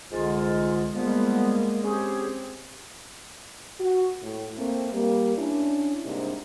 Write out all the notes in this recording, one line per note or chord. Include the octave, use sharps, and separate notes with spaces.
C2 G#2 D3 G#3 F4
F3 G3 G#3 A#3 B3
C4 C#4 G4 G#4
F#4
A2
A3 A#3 C4
G3 A#3
C#4 D4 E4
G#2 C3 G3 A#3 D4 D#4